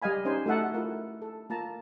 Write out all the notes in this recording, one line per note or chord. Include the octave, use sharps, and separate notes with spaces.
G3 D#5 F5 G#5 B5
C#4 D#4 C5 G#5
A3 D#4 F#4 E5 F#5 A5
E4 F4 A#4
A4
A#3 F4 A5 A#5